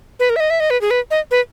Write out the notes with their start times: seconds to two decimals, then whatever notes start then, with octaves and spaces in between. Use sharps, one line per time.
0.20 B4
0.30 A#4
0.36 E5
0.40 D#5
0.50 E5
0.60 D#5
0.70 B4
0.81 G#4
0.91 B4
1.11 D#5
1.31 B4